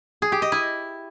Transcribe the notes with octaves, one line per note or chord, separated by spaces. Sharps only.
G#4
G4
D#5
E4